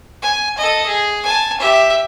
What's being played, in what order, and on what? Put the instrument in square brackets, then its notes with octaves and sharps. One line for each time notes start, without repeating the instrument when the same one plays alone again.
[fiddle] G#5
A4 D#5
G#4
G#5 A5
G4 E5